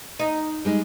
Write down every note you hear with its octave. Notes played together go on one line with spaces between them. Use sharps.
D#4
G3 G#3 D#4